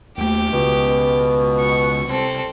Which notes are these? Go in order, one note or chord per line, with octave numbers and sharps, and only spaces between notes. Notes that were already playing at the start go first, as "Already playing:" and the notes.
D#2 A3 G4
C#2 B2
C#6
C2 C4 A4